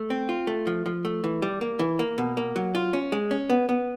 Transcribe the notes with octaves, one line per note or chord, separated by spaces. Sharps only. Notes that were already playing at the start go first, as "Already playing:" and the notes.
Already playing: A3
C4
F4
A3
F3
F3
A3
E3
G3
A#3
E3
A#3
B2
A#3
F#3
F4
C#4
G#3
C#4
B3
B3